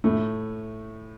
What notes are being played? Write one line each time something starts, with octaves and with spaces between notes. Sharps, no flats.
A2 A3